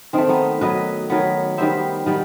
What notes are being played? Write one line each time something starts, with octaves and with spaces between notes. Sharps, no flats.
D#3 A3 C4
B3 D#4
D#3 F#3 B3 B4 D#5
D#3 F#3 B3
D#3 G3 B3 C5 E5
D#3 G3 B3